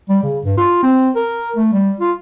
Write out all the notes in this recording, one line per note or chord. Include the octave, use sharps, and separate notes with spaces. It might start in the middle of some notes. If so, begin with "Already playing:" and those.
G3
C#3
G2
F4
C4
A#4
A3
G3
F4